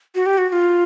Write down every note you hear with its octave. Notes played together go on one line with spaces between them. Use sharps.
F#4
G4
F#4
F#4
F4